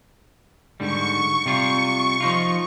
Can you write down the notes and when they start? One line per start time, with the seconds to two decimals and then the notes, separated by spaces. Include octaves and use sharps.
0.80 G#2 D3 G3 C#6
1.46 C3 G3 F4
2.20 F3 D#4 F4